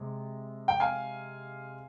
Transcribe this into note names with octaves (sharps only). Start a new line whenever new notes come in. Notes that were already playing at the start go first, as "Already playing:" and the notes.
Already playing: C3 G#3
G5
F5 G#5